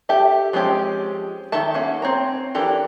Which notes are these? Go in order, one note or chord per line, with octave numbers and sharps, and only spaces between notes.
G4 A4 E5 A5
F3 G#3 C4 C#4 G4
D#3 A4 E5 A5
A#3 C#4 F#5
C4 C#5 A#5
E3 D4 G4 A4 A#4